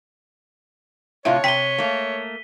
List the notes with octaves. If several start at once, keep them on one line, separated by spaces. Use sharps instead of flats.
A2 C3 F4 C#5 E5
C3 G5 B6 D#7 G7
A3 A#3